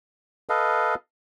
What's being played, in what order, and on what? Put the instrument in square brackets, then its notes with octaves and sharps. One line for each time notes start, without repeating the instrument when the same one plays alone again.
[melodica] A4 B4 D#5 F5